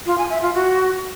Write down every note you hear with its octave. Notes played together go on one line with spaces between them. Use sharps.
F4
G#5
E5
F4
F#4